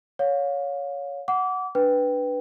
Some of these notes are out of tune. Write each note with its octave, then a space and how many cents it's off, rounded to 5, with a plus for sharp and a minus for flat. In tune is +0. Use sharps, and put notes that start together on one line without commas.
C#5 +15 F5 +35
F#5 +0 D6 -25
D4 +0 B4 +0 G5 +0